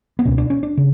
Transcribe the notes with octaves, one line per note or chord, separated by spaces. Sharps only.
B3
C#2 B2 C#4
D4
C#4
D4
C#3